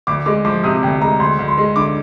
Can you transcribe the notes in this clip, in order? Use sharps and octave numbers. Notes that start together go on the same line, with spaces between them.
D2 D6
G#3 D6
F3 D6
C3 D#6
D2 G5
G#3 A#5
D2 C6
D2
C6
G#3
D3 D6